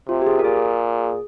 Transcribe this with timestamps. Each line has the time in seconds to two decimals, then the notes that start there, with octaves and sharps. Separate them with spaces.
0.09 C3 F4
0.22 G4
0.27 G#4
0.39 A#4
0.44 A#2 G#4